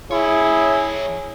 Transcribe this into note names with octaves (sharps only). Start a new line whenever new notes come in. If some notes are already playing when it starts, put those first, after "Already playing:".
E3 E4 G#4 C#5